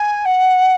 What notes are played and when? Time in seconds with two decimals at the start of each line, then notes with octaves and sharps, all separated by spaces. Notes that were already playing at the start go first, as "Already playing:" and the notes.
Already playing: G#5
0.25 F#5